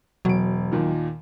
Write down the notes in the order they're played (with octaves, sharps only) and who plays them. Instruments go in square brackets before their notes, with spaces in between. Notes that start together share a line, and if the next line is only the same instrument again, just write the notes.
[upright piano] E1 D7 [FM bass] F#3
[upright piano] D#2 A#2 D#3